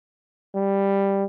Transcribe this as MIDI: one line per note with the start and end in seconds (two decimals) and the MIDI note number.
0.55 1.24 55